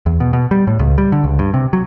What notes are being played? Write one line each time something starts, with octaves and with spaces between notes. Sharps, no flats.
E2
B2
B2
G3
A2
C#2
G3
D3
C#2
G2
C3
F#3